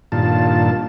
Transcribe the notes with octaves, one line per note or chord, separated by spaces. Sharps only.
G2 A#2 D#3 F4 A5